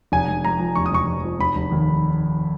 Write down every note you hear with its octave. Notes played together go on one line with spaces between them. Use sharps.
F1 G#5
F1
F2 A#5
F3
F1 C#6
D#6
F1 C#6
F2
F3
F1 B5
F1
D#2